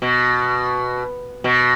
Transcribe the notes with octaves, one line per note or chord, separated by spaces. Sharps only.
B2
B2